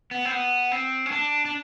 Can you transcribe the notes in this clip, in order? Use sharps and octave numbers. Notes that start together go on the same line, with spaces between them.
B3
C4
B3
C4
C#4
D4
D4